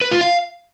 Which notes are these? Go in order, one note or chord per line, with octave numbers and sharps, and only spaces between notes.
B4
F4
F5